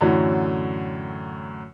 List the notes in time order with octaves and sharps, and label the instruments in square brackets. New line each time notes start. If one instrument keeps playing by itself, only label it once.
[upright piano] F#2 A2 D3 E3 F#3 C#4